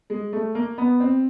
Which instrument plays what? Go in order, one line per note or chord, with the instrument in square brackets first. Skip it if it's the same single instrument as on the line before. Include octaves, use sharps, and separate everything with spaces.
[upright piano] G#3
A3
A#3
B3
C4